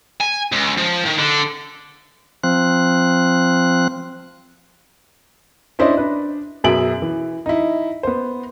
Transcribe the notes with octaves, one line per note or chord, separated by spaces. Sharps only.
G#5
C#2
F3
D#3
D3
F3 C4 F#6
C#4 D4 E4 C5 D5 D#5
D4 B4
F#2 B2 G#4 E5 D7 F#7
E3
D#4 E4
B3 C5